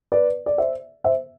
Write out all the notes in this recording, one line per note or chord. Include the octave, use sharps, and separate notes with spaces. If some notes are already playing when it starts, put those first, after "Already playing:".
B4 D5
D5
C5 E5
C5 E5